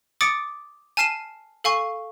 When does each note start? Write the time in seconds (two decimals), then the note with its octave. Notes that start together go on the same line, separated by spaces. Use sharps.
0.21 D6 D#6 A6 C#7 D7
0.97 G#5 A5 F6 C7 D#7 E7
1.64 A4 F5 G#5 C#6